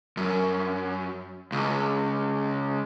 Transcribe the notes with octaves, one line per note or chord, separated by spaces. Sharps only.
F#2
C#2